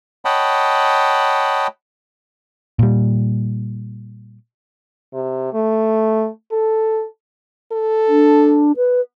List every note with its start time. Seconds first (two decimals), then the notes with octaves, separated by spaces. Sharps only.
0.25 C#5 D#5 F#5 G5 A5 B5
2.79 A#2 G3
5.13 C3
5.54 A3
6.52 A4
7.72 A4
8.08 D4
8.76 B4